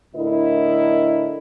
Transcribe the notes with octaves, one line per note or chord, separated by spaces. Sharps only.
A2 D3 E4 A#4 D#5